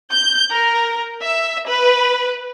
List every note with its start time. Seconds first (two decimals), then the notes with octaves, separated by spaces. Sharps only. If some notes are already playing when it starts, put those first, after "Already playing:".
0.10 G6
0.52 A#4
1.22 E5
1.67 B4